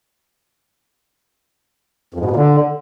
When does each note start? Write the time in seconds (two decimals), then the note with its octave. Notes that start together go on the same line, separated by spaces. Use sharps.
2.14 F2
2.20 G#2
2.25 B2
2.31 A#2
2.36 D3